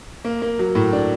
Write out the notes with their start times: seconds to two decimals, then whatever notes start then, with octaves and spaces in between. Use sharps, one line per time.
0.25 A#3
0.42 A#3
0.59 F#3
0.75 A2
0.93 D4